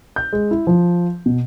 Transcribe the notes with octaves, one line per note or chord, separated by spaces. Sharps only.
G6
G#3
E4
F3
B2